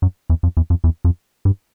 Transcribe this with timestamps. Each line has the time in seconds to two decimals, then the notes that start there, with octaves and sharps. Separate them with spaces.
0.02 F#2
0.30 E2
0.43 F2
0.57 E2
0.70 F2
0.84 E2
1.05 F2
1.45 G2